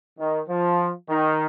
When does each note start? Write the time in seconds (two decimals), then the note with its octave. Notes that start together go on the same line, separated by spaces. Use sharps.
0.19 D#3
0.49 F3
1.09 D#3